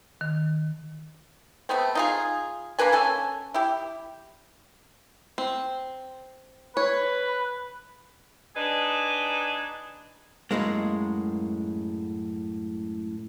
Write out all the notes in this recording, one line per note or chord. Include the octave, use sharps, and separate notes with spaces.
D#3
A3 B3 C4
D#4 F4 G#4
A#3 D4 B4 G#5
C#4 A4 G#5
E4 G4
C4
B4 C#5
D4 D#4 G#4 B4 D#5
F#2 A2 G#3 A#3